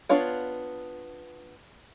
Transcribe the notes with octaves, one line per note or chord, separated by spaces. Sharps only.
B3 D4 F4 C#5 F5